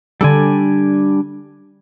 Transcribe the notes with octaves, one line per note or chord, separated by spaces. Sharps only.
D3 G3 D4 A4 G#5